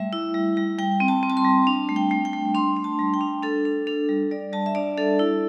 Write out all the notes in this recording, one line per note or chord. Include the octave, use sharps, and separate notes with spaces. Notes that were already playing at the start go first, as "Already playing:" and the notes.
Already playing: G3 A3 E5
E4
G3
G3
G3 G5
C4
A5
C4
A5
C6
G3
D4
A3
G5
A3
G5
A3
D4 C6
D4
A5
G3
G5
D4
D4 A4
D4
D4 A4
G3
G3 D5
G3 A5
E5
D4 D5
D4 A4
E4